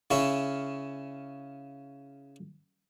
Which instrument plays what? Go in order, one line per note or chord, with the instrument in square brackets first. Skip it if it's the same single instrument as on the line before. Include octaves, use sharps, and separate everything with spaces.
[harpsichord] C#3 C#4 E4